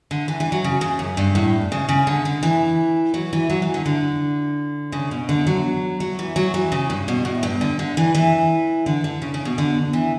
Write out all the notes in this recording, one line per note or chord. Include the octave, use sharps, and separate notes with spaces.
D3
E3
E3
F#3
C#3
C#3
F#2
G2
A2
C#3
C#3
D3
D3
E3
F#3
E3
F#3
E3
D3
D3
C#3
B2
D3
F#3
F#3
E3
F#3
E3
C#3
G2
B2
A2
G2
D3
D3
E3
E3
D3
D3
C#3
C#3
B2
D3
E3